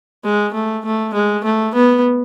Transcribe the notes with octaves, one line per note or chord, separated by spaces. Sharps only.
G#3
A3
A3
G#3
A3
B3